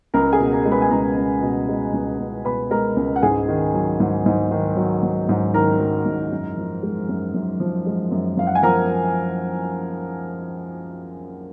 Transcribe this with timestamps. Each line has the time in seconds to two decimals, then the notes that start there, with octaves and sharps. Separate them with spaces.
0.14 C#2 A#4 A#5
0.33 G#4 G#5
0.40 B2
0.52 A#4 A#5
0.66 G#3
0.72 B4 B5
0.82 G#5
0.91 C#2 A#4 A#5
1.17 C#2
1.42 B2
1.69 G#3
1.94 C#2
2.20 C#2
2.45 B2 B4 B5
2.71 G#3 A#4 A#5
2.97 C#2
3.16 F#5
3.23 G#2 G#4 G#5
3.48 D#3
3.74 F#3
4.00 G#2
4.26 G#2
4.51 D#3
4.77 F#3
5.03 G#2
5.29 G#2
5.54 D#3 A#4 A#5
5.80 F#3
6.06 G#2
6.32 F#2
6.57 F3
6.83 G#3
7.09 F#2
7.34 F#2
7.60 F3
7.86 G#3
8.11 F#2
8.37 F#2 F5
8.47 F#5
8.55 G#5
8.63 F3 A#4 A#5